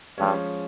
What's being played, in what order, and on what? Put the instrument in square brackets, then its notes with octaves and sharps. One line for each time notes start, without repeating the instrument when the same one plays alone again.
[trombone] G2 [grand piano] F3 G#3 C#4